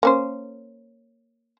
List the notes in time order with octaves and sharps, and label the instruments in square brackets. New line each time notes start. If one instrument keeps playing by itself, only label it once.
[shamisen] A#3 C#4 C5